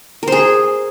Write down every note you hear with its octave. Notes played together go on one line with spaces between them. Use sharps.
G#4 A#4 C5